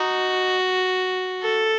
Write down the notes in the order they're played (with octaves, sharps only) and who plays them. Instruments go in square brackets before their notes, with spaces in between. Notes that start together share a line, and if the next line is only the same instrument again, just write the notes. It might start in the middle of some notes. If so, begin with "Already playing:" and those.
Already playing: [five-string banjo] D#4 [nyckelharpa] F#4
[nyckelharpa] A4